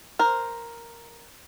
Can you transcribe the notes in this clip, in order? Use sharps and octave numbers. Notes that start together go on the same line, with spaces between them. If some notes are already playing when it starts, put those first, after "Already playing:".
A#4 C5